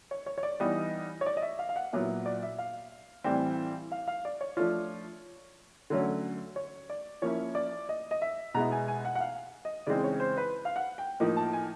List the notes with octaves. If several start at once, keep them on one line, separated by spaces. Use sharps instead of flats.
C#5
C#5
C#5
D5
E3 G3 B3 D#4 D#5
C#5
D5
D#5
E5
F5
F5
F#5
A#2 F#3 B3 E4 E5
D5
E5
F5
A2 E3 G3 C4
F5
F5
D5
C#5
F3 A3 D4 F4 C#5
D3 F#3 A3 C#4
C#5
D5
F3 A#3 C#4 E4 C#5
D5
D#5
D#5
E5
B2 G#3 B3 E4 A#5
G#5
G#5
F#5
F#5
F5
D#5
C#3 E3 G#3 C4 D#4 D5
C#5
C5
B4
F5
F#5
G5
A2 F3 A#3 D#4
A5
G#5